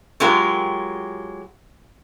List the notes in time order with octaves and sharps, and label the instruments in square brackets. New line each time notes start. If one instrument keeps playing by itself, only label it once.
[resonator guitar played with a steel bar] F#3 G#3 F4 G4 A#4